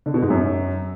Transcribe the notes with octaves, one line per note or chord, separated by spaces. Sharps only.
D3
B2
G#2
F#2